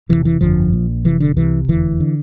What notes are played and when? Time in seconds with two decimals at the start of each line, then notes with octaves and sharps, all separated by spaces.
0.09 E1 D2 C3 E3
0.25 E3
0.41 G1 F2 D3 F3
0.72 A#1 A#2
1.05 F1 F2 C3 E3
1.20 D3
1.36 C2 C3 E3
1.68 F1 E2 D3 E3
2.00 D3